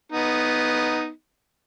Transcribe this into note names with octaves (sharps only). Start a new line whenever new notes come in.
B3 D#4